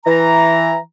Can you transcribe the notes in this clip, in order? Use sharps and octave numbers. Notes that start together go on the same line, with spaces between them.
E3 A#5